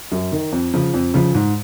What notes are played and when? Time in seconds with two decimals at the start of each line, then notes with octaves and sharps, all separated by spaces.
0.12 F#2
0.32 D#3
0.52 F2
0.74 C#3 F3
0.94 F2
1.14 C#3 F3
1.34 G#2